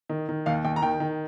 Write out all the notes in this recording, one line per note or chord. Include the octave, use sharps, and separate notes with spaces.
D#3
D#3
D#2 F5
D#2 G5
A#5
D#3 G5
D#3